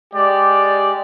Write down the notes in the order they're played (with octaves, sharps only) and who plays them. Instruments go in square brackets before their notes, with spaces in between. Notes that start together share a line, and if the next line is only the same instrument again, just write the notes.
[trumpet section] G#3 G4 D5